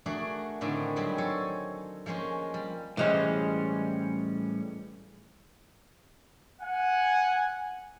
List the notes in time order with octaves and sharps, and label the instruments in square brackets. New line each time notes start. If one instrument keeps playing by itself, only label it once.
[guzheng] A3 D4 F#4 G#4 A#4
A2 D3 D#3 C4 D4 F4
F#3 G3 B3 C4 G#4
A4 C5 C#5 G#5
F3 G#3 A#3 C#4 F4
G3
[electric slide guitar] A2 G3 C#4 [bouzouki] E3 G#3 C5
[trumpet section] F#5 G#5